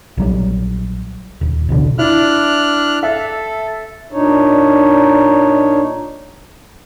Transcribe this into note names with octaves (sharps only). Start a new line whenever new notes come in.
A#1 F#3 G3
D#1
D1 A1 B2 D3
D4 E4 F6 F#6
A4 E5
A#2 D4 D#4 C#5